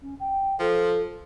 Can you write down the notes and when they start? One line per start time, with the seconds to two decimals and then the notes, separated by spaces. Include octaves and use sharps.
0.01 C#4
0.20 G5
0.60 F3 A4